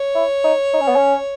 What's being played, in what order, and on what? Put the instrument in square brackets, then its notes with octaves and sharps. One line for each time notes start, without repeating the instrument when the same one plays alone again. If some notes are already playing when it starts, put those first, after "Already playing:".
Already playing: [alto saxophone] C#5
[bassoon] E4
D#4
D#4
C#4
B3
C#4